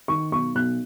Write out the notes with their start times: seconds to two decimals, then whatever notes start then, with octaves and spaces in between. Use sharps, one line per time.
0.08 D#3 C#6
0.31 B1 C#6
0.55 B1 F#6